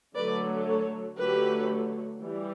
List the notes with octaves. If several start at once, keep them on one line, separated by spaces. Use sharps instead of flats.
D3 F#3 A3 B4 D5
A4 C#5
D3 F#3 A3 G4 B4
E3 G3